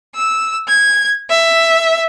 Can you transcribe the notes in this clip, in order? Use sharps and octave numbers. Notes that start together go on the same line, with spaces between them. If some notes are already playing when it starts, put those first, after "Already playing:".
E6
G#6
E5